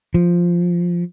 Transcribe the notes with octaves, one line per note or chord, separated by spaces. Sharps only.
F3